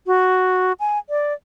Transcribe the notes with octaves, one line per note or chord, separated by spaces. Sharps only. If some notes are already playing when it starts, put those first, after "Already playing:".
F#4
G#5
D5